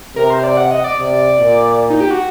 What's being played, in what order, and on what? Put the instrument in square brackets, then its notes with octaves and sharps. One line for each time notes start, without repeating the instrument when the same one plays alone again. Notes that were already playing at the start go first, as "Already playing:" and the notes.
[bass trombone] C3 [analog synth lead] A#4
[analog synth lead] C5
D5
F#5
D#5
D5
[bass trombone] C3
A#2
[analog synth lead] D#4
G4
F#4